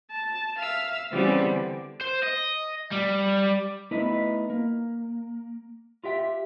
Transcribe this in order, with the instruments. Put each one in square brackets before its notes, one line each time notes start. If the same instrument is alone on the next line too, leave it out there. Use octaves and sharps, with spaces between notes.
[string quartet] A5
E5 F5 E6 F6
C#3 E3 G3 B3 C4
D3
[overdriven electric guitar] C5
D#5
G3
[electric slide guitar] A3 B3 D#4 E4 B4
A#3
F4 G4 E5 G5